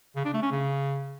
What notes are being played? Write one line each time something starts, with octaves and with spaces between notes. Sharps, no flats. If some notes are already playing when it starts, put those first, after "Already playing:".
C#3
D4
A3
C#4
C#3